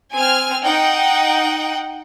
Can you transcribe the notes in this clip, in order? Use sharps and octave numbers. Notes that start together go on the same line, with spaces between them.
C4 G#5 F6
D#4 F#5 G5